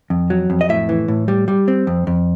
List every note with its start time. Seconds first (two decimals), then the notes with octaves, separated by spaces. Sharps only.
0.10 F2
0.30 F#3
0.50 F2
0.61 D#5
0.69 A2 E5
0.89 E3
1.08 A2
1.28 G3
1.48 G3
1.68 C4
1.87 F2
2.07 F2